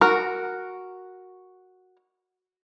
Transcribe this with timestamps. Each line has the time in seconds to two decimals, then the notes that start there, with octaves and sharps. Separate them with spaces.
0.01 F#4 A#4